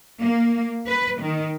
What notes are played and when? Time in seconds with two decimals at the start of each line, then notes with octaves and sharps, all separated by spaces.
0.21 A#3
0.88 B4
1.21 D#3